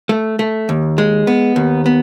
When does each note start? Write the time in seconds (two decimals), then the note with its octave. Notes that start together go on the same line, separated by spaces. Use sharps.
0.09 A3
0.39 A3
0.69 D#2
0.98 G#3
1.27 B3
1.56 D#2
1.86 B3